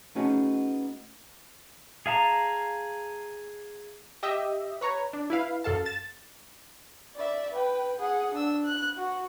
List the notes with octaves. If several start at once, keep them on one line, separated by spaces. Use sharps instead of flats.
A3 B3 C#4 D#4 F#4 G#4
G#4 F5 A5 A#5
G4 D#5 E5
B4 C#5 A#5
D4
E4 B4 F5
F#2 A4 F5 A5
A6 E7
D5 E5
B4 G5
G#4 F#5
D4 E6
F#6
F#4